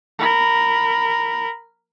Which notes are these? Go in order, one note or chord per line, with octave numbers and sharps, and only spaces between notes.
A#4 B5